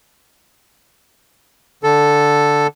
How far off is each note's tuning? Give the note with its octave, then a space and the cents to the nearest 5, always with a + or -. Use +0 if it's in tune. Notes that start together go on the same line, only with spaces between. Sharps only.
D3 +0 A4 +0